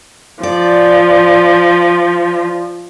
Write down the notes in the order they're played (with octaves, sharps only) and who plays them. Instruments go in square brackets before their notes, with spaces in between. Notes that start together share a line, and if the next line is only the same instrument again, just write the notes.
[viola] F3 [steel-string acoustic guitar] D5